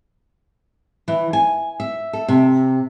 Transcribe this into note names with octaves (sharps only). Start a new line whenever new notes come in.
E3
G#5
E5
A4
C3